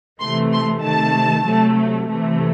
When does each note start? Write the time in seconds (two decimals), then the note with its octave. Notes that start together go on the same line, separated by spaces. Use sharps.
0.20 C3 E3 A3 C6
0.52 C6
0.83 C3 D#3 A3 A5
1.45 C3 F#3 A3
2.08 C3 E3 A3